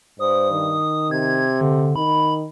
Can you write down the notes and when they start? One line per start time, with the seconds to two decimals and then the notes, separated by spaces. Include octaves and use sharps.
0.20 G2 C5 D#6
0.51 D#3
1.11 C3 G#6
1.61 D3
1.96 D#3 B5